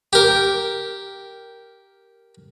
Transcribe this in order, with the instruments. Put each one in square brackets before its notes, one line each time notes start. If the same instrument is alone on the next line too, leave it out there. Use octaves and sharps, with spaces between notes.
[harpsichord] G4 A#4